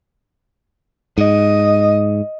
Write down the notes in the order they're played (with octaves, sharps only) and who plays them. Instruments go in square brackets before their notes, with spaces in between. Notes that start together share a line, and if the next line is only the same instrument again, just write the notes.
[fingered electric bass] G#2 [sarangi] D#5